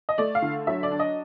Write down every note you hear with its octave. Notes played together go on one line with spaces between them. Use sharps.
D#5
A3 D5
F5
D3
F#3 E5
D5
D4
D#5